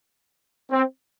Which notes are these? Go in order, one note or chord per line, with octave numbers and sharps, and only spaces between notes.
C4